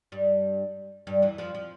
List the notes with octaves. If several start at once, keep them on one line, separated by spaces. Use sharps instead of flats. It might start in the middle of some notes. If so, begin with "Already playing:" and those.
G2 G3
G2 G3
E2 E3
F2 F3
F3